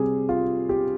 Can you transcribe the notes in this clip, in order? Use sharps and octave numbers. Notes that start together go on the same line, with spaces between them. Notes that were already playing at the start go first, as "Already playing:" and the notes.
Already playing: C3 G3 G#4
F4
G4